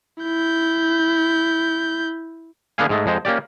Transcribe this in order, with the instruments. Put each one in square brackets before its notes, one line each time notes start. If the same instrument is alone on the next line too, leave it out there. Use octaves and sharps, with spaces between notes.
[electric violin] E4 G6
[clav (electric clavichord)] D3 A#3 B3 G#4 F5 G#5
G#2 G#3 A3
F2 G#3 C5
A#3 C#4 G4 D5